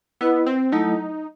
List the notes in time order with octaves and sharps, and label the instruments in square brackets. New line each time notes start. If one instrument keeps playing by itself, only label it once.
[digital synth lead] B3 [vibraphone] E4 B4 D#5 F#5
[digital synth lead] C4
[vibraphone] F#3 A3 E4 A4 [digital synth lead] D#4